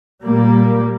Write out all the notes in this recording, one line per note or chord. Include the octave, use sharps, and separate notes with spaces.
A#2 G3 A#3